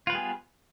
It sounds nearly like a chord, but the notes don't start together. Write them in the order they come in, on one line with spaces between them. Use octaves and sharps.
F4 B4 G3 G#4 B3